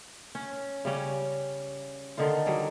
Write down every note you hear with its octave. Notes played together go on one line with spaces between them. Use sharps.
C#4
C#3 G3 C#4
D3 D#3 D#4 F4
F#3 G3 G#4